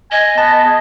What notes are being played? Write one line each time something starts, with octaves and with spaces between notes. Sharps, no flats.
D#5 G#5
B3 A5
G#4